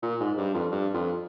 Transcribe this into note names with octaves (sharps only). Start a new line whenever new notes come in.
A#2
G#2
G2
F2
G2
F2